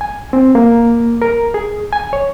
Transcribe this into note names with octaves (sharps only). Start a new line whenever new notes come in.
G#5
C4
A#3
A#4
G#4
G#5
C#5